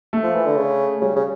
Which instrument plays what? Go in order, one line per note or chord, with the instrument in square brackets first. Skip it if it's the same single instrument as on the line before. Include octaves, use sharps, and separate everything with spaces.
[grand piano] A3
[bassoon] F3
E3
D3
C#3
[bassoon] C#3 [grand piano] G3
[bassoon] C#3